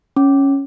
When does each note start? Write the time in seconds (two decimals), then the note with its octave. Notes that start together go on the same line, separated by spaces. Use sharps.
0.16 C#4